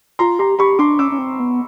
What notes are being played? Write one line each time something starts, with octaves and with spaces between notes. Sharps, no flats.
F4 A#5 C6
G4 A#5 C6
G4 B5 C#6
D4 C6 D6
C#4 D6 E6
C#4
C4
B3